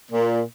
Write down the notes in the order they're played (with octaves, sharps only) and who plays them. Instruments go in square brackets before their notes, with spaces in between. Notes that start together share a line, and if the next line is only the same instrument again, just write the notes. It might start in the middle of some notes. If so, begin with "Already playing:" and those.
[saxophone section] A#2